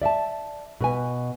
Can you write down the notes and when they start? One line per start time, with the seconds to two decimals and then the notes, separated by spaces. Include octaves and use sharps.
0.02 D5 E5 F#5 A5
0.81 B2 B4 G#5